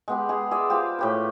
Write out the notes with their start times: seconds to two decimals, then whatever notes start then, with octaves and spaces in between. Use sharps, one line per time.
0.08 G#3 B3 G4
0.29 G#3 G#4
0.51 G#4 D5 E5
0.70 F4 G4 C5 F5
0.99 A2 G4 B4